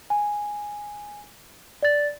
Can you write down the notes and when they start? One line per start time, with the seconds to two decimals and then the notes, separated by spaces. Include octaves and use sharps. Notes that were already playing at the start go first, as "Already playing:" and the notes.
0.10 G#5
1.82 D5 A6